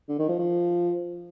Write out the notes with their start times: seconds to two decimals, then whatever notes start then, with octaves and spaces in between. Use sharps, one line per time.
0.09 D3
0.19 D#3
0.29 F3
0.39 F3